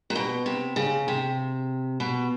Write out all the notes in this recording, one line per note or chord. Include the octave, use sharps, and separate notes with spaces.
A#2
B2
C3
C#3
C3
B2